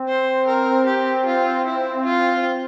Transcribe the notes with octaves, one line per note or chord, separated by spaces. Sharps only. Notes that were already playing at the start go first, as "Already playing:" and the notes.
Already playing: C4
C5
A#4
G4
F4
E4
F4